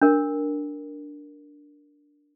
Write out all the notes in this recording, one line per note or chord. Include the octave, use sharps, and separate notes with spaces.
D4 A#4